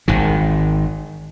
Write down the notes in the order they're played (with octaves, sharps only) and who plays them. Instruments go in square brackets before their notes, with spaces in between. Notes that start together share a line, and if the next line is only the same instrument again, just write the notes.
[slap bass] G#1 D#3